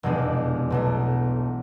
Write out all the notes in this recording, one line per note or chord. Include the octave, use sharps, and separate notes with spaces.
F1 E2 B2 G#3 D4
B1 B2 A3